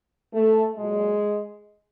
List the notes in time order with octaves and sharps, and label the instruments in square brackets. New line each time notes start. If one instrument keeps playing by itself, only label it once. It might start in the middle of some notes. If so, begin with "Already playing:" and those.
[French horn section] A3
A#2 F#3 G#3